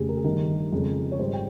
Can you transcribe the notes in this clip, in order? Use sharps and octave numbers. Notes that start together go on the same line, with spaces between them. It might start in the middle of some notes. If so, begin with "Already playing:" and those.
Already playing: F1 D#2 C#3 G4 G#4
A#4
G#4
G1 G2 D#3 A#4
F2 C#3 G#3
C#5
G#1 G#2 G3 C5
G5